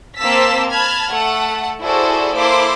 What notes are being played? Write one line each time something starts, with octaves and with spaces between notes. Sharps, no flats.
A#3 C4 C5 A5 E6 B6
A5 B5 F6 G#6
A3 A4 F#5
E4 F#4 G#4 A4 C5 D5
A#3 E4 A4 C5 C6 D6